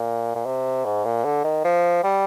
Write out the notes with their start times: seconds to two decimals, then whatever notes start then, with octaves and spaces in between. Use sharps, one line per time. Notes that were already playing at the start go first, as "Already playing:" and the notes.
Already playing: A#2
0.35 A#2
0.45 C3
0.85 G#2
1.05 A#2
1.25 D3
1.44 D#3
1.64 F3
2.04 G3